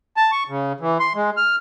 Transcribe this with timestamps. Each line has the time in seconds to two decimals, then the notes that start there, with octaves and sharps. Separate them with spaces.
0.17 A5
0.32 C#6
0.49 C#3
0.80 E3
1.00 C6
1.15 G#3
1.37 F6